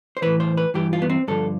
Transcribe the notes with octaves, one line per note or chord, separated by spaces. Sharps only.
C5
A2 E3 B4
C5
B4
G2 E3 G4
F4
B3
C4
G2 D3 F3 A4